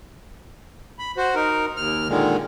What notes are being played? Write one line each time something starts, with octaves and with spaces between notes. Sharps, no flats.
B5
F#4 C5
D#4 A#4
D#2 F6
A#2 D3 D#3 G#3